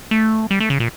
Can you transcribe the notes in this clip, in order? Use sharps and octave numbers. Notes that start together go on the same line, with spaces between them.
A3
G3
A3
C#3
A#2